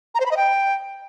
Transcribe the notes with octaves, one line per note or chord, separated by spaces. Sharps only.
A#5
C5
B5
D#5
G5